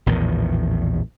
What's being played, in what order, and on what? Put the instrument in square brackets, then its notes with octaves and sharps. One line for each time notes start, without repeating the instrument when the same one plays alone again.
[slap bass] A#1 E2 A2 D#3